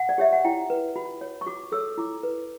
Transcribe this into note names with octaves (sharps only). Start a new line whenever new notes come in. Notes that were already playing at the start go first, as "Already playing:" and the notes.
Already playing: F#5
D5
G4 C#5 E5
F#5
E4 G5
B4
F#4 B5
C#5
C#6
F#4 D6
A4 C#5 E6
E4 D6
B4